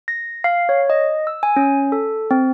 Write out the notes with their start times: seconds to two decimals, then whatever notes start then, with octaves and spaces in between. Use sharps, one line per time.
0.08 A#6
0.44 F5
0.69 C#5
0.90 D#5
1.27 E6
1.43 G#5
1.56 C#4
1.92 A4
2.31 C4